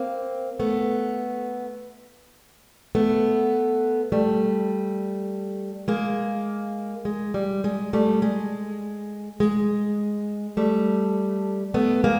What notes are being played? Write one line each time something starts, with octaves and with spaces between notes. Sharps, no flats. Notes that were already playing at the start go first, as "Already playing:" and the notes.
Already playing: A#3 C4
A3 B3
A3 B3
G3 A3
G#3 A#3
G#3
G3
G#3
G3 A3
G#3
G#3
G3 A3
A3 B3
G#3 A#3